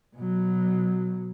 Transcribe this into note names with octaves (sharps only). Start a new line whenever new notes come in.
B2 F#3